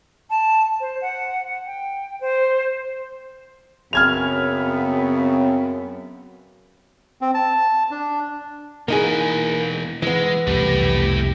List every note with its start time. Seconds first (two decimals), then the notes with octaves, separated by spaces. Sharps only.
0.30 A5
0.80 C5
1.01 F#5
1.66 G5
2.21 C5
3.93 F#2 C#3 B3 C4 F6 G#6 F7
7.21 C4
7.34 A5
7.91 D4
8.88 B2 E3 A#3 D#4 G#4
10.02 E3 G#3 B3
10.47 C2 F2 B2 A3 E4 G4